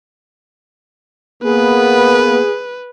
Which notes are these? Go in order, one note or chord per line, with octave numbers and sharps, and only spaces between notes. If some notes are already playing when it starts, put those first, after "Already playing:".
A#3 B3 G#4 B4